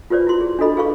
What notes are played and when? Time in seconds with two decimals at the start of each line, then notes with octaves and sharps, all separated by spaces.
0.10 F4 G4 B4 C5 D5
0.27 E4 F#4 C6
0.41 G#4
0.59 D4 E4 F#4 A4 D#5 B5
0.77 G#4 B4 F5 B5 C#6 D6